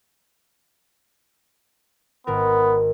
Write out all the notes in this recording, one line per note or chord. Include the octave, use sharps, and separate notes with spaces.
G#1 B3 A#4